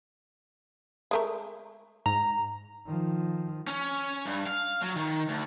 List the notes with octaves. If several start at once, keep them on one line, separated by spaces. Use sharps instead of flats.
G#3 A3 A#4
G#2 A#5
D#3 F3
C#4
G2
F5
F#3
D#3
D2